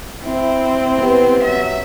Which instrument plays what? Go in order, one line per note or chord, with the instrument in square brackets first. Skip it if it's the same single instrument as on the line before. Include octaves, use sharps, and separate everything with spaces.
[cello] C4 [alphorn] E4
[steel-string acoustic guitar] B3 G4
[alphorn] F#3 [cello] E5